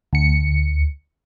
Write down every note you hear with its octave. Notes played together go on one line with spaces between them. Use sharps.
D2 C#7